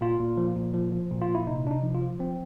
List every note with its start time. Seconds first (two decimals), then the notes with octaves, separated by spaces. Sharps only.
0.01 A#2 F4
0.19 A#2
0.37 F3
0.56 A#2
0.74 F3
0.92 F3
1.11 A#2
1.22 F4
1.28 A#2
1.35 E4
1.47 C3 D#4
1.65 C3 D4
1.71 D#4
1.83 F3
1.95 F4
2.01 F3
2.19 F3 C4